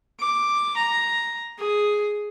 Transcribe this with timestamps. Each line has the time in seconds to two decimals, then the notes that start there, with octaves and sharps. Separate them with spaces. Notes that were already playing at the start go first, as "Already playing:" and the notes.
0.20 D6
0.77 A#5
1.59 G#4